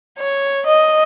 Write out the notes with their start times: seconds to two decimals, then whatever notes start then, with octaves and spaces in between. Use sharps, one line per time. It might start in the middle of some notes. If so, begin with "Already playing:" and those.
0.19 C#5
0.66 D#5